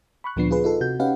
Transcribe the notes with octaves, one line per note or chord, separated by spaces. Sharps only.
B5 C#6 F#6
D2 A#2 F3 B3 D4 C7
F4 G#4 B4
D#4 F4 A4
C3 F#4 G6
C#4 D#4 G4 B4 F5 F#5